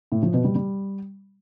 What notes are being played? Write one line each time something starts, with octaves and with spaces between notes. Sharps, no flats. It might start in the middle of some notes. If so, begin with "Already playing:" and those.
A2
F3
B2
G3
G3